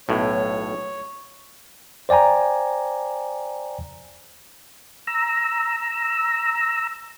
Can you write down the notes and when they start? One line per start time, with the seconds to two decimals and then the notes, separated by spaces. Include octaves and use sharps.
0.09 B1 A2 C#5
2.09 C5 D5 G5 G#5 A#5
5.07 A#5 E6